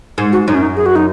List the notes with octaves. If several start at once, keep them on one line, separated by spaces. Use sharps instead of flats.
G#2
F#4
F#2 D#4
C#4
D#4
G#4
F#4
D#4